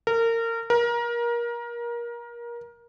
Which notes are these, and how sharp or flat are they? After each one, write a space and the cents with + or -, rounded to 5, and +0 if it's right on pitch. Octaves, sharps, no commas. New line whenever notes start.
A#4 -25
A#4 +25